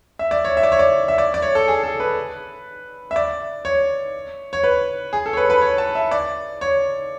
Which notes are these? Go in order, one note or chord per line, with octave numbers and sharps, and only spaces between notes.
E5
D5
C#5
E5
D5
C#5
D5
E5
D5
D5
C#5
A4
G#4
A4
B4
E5
D5
C#5
C#5
B4
G#4
A4
C#5
B4
B4
C#5
A5
E5
D5
C#5